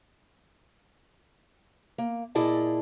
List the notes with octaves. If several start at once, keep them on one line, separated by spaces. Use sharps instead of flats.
A#3
A#2 E4 G#4 D5 D#5 A5